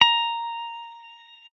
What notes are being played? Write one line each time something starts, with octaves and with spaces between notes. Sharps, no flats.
A#5